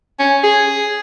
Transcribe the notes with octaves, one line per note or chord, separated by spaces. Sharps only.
C#4
G#4